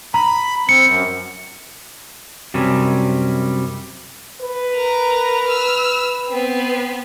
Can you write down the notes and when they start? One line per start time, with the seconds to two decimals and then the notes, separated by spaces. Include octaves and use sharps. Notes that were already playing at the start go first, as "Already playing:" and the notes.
0.14 A#5 B5
0.69 C4 C#7
0.86 F#2
2.54 F#2 C3 G3 C#4
4.41 B4
4.74 A#4 A#5
5.47 E6 F6
6.30 B3 C4